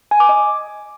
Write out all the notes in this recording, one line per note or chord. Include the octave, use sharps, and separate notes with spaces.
G#5
D6
D#5